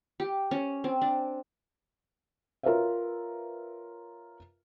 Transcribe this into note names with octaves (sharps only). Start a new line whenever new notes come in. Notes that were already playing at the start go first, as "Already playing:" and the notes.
G4
C#4
C4
D4
F4 A#4 B4 C#5 E5 F5